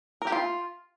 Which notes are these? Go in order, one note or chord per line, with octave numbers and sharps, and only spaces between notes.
A#4
G4
F4